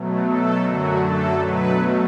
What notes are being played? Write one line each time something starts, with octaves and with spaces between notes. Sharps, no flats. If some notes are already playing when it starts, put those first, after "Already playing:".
Already playing: B2 F#3 A3
A4
F#2 D3 F#3 A3 F#4
A4
B2 F#3 A3 B4